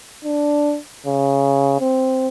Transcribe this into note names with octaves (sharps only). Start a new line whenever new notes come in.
D4
C#3
C4